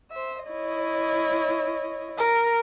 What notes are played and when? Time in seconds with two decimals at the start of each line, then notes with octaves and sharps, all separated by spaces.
0.11 C5 E5
0.47 E4 C#5 D#5
2.18 A#4